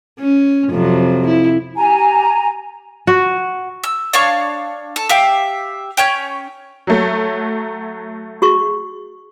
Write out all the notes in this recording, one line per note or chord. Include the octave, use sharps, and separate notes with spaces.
C#4
F2 C3 F#3
E4
G4 G#5 A#5
F#4
E6
D4 C#5 F5 C#6
A4
G4 E5 F5 G5
C#4 C#5 G5
F#3 A3
F#4 G#4 C#6